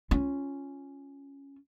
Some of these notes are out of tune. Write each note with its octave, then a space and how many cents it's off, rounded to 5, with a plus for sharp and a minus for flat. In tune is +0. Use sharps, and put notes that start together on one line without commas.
C#4 +0 F4 -5